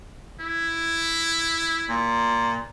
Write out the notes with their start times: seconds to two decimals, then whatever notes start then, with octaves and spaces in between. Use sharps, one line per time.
0.40 E4
1.89 A#2